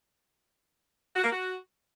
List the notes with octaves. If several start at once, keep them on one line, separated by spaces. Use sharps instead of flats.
F#4
A#3
F#4